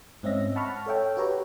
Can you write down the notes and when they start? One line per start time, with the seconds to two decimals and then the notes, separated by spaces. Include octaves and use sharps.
0.23 G#2 C4 C#4 D#5 E5 A#6
0.56 F#5 A5 B5 C#6 F6
0.86 A4 C#5 E5 G5
1.17 F#4 G4 B4 C#5 A#5